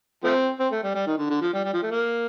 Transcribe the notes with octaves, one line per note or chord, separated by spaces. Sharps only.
F3 A3 C4
C4
A3
G3
G3
D#3
D3
D3
F3
G3
G3
F3
A3
A#3